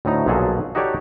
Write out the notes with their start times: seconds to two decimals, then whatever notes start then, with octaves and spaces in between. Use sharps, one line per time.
0.05 D2 A2 A3 D#4 A#5
0.26 B1 A#2 F3 F#3 G#4 A4
0.75 D#4 F#4 G4 A4 C#5 D5